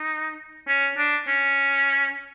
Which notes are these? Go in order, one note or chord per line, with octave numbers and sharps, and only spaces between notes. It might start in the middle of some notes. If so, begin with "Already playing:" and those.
Already playing: D#4
C#4
D4
C#4